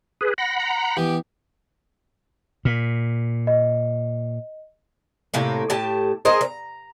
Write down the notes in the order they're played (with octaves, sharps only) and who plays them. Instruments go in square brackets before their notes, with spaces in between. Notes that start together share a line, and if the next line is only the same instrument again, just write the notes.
[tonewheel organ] G#4 B4
[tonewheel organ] F#5 B5 [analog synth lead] A#6
[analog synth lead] A#5
[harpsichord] E3 B3 [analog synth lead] G4
[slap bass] A#2 [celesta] F6 B6
[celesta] D#5
[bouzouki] A2 C3 A#3
A2 G4 A5
G#4 A#4 C5 D#5
A#5